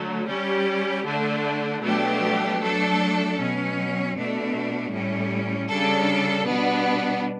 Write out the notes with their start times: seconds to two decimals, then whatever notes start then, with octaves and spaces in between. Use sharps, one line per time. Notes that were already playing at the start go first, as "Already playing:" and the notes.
Already playing: D3 F#3 A3
0.27 G3 C#4 G4
1.06 D3 A3 D4
1.83 B2 F#3 A3 D4 G4
2.60 F#3 A3 D4 A4
3.37 B2 F#3 C#4
4.14 B2 A3 D4
4.92 A2 G3 C#4
5.69 C#3 G3 D4 A4
6.47 B2 G3 B3 D4